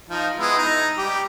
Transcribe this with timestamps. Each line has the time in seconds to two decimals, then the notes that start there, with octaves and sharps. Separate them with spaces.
0.09 F3 D#4
0.39 G#3 B3 E4
0.57 D#4
0.98 G3 G4